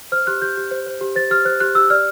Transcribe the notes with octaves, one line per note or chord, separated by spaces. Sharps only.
C5 F6
G4 F#6
G4 G6
G4
C5
C5
G4
C5 A6
G4 F6
C5 F#6
G4 F#6
G4 E6
D5 F6